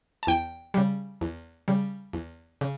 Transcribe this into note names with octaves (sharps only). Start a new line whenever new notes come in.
A5
E2 G5
C#3 G3
E2
C#3 G3
E2
C#3